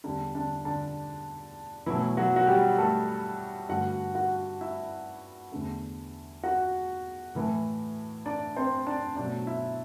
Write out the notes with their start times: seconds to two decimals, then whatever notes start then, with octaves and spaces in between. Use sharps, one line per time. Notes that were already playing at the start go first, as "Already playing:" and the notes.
0.04 E2 D3 G3 D4
0.35 D3 D4
0.65 D3 D4
1.86 B2 E3 F#3 A3 E4
2.17 F#3 F#4
2.36 F#4
2.47 G3 G4
2.78 A3 A4
3.69 G2 D3 A3 F#4 F#5
4.15 F#4 F#5
4.61 E4 E5
5.52 E2 D3 A3
6.44 F#4 F#5
7.35 A2 E3 A3
8.26 D4 D5
8.56 C4 C5
8.87 D4 D5
9.16 B2 F#3 A3 D4 D5
9.47 E4 E5